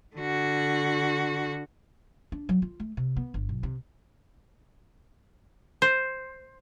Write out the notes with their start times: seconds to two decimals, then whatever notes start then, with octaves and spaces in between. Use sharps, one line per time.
0.16 D3 F#4
2.32 D4
2.49 F#3
2.62 F4
2.80 A3
2.97 C3
3.17 B3
3.34 G1
3.49 B1
3.63 C3
5.82 C5